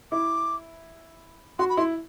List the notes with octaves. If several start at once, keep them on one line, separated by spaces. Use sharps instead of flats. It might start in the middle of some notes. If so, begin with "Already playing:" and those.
E4 D6
F#4 C6
B5
E4 C6